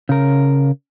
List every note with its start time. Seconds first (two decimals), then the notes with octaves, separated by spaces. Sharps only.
0.09 C#3 A#4